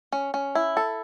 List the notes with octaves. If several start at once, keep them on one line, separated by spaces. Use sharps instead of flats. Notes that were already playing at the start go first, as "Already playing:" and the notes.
C#4
C#4
E4
A4